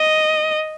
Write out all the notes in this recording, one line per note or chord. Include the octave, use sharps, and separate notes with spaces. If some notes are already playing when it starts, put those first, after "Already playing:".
Already playing: D#5